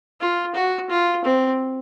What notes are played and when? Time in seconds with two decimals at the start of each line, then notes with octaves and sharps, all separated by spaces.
0.20 F4
0.55 F#4
0.90 F4
1.25 C4